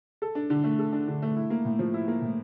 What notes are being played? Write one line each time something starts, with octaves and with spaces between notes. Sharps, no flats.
A4
D4
D3
A3
A4
D4
D3
A3
E4
A#3
A2
F3
E4
A#3
A2